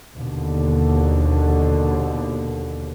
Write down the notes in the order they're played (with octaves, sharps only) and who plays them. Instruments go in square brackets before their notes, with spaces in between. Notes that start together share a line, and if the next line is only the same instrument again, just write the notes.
[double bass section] D#2 B2 D3